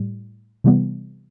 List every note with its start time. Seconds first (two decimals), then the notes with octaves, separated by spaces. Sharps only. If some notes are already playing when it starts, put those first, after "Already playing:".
Already playing: A2 G3
0.64 C3 E3 G3 B3